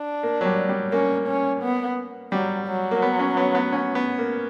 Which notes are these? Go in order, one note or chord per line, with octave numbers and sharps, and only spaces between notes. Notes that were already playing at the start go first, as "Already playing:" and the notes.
Already playing: D4
A#3
F#3
G3
G3
A#3 C#4
C#4
B3
F#3 G3
F#3
A#3
B3
C#4
B3
B3
C#4
B3
A#3